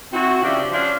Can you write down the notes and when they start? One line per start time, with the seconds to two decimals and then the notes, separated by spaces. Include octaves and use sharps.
0.13 C4 E4 F#4
0.43 C#3 F3 D4 G4 E5
0.72 F3 C#4 D4 F5